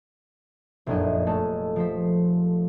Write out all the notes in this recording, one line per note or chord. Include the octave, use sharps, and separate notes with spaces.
F1 A#1 F#2 A#3 E4 D#5
G#3 A3 A4 D#5
F3 C5 B6